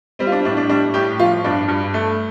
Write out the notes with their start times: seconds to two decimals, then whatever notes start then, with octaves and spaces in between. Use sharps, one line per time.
0.19 G3 C4
0.27 F4
0.32 D4
0.45 A2 D4
0.57 D4
0.69 G3 D4
0.94 A2 G4
1.19 F3 F4
1.44 G2 D4
1.68 G2
1.94 A3